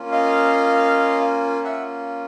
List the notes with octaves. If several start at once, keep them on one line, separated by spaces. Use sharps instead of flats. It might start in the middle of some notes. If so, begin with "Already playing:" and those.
Already playing: A#3 C#4 F4
D#5 F5
E5 F#5